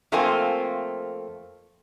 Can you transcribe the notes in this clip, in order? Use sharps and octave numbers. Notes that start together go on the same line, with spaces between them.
F2 A3 A#3 C4 F4 G#5